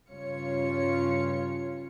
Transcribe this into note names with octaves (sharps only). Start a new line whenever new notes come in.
G2 C#3 F4 C#5 C#7